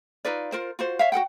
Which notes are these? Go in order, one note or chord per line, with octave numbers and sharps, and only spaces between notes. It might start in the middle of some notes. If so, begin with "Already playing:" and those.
D#4 F4 B4 D5
F4 A#4 C5
F4 F#4 C5
C#5 E5 F5
F#4 A4 F#5 G5